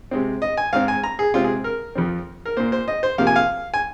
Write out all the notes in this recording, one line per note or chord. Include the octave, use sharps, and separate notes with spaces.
C3 G#3 C4
D#5
G#5
G#2 G#3 C4 F5
G#5
A#5
G#4
C3 G#3 C4 F4
G#4
A#4
F2 F3 C4
A#4
A#2 A#3 C5
C5
D#5
C5
C3 F3 A#3 F5
G#5
F5
G#5